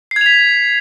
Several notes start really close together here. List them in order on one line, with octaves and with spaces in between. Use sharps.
C7 G#6 F7 B6